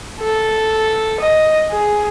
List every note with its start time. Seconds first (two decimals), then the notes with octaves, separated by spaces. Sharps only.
0.21 A4
1.21 D#5
1.71 G#4